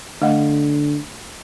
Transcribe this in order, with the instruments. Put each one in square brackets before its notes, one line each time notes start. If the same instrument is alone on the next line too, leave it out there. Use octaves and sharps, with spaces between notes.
[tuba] D3 [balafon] A3 D#5 F#5